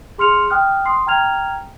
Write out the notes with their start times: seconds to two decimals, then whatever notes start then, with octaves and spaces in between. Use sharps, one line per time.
0.18 G#4 C6 F6 C#7 F7
0.50 G5 D#6 F6 F#6
0.85 C6 D#6 C7
1.06 G5 A#5 F6 G#6 F7